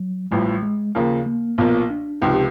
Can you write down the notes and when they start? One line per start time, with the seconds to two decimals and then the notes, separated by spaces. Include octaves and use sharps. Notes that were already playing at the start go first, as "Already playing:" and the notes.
Already playing: F#3
0.31 A1 A2 F3 G3
0.62 G#3
0.95 D#2 C#3 F3 A#3
1.26 A#3
1.58 B1 A#2 F3 A#3 B3
1.90 D4
2.21 C#2 C3 F3 D#4
2.34 G4